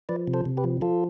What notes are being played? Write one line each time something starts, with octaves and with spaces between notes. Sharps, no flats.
F3 B4 D5
C3
A4 C5
C3
G4 B4
F3
F3 F4 A4